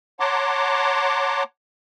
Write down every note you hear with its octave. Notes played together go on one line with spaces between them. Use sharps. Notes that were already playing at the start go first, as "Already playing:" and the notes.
C#5 F#5 A5 A#5 C6 D6